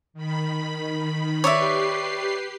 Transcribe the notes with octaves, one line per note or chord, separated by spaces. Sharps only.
D#3 B5
G4 B4 C#5 D5 E5 C7